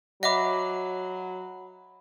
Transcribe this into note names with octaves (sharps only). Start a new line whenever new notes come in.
F#3 D#5 E5 F#5 B5 D6